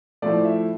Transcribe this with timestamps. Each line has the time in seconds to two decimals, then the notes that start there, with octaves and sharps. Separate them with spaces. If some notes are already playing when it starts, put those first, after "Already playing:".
0.22 A2 F3 A3 D5
0.45 E5